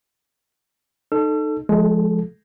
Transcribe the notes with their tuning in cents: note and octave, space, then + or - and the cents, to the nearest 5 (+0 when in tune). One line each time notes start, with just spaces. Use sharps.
D#4 -25 A4 +0 E6 +40
F3 +0 G#3 +25 A4 -15